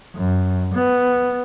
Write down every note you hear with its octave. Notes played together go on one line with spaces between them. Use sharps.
F#2
B3